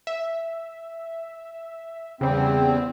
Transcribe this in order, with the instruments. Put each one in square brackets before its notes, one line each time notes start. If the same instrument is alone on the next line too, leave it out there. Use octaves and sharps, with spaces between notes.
[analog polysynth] E5
[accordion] E2 C4 [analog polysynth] C#3 G3